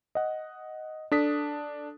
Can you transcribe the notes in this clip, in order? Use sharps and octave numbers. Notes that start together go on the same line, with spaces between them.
D#5 F#5
D4 A4 D#6 B6